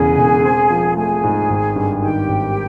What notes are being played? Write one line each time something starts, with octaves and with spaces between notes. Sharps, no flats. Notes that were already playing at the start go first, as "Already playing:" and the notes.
Already playing: E1 E2 C#3 G#4 G#5
E1
C4
F3
A3 G#4 G#5
G#2
G#1
G2
D#3 G4 G5
G#1